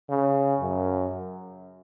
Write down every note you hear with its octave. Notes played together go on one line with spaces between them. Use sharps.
C#3
F#2